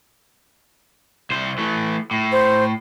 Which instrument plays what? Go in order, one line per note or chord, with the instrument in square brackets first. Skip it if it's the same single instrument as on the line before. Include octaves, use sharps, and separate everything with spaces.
[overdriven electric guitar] C2 C5
E3 A3
A2
[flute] C5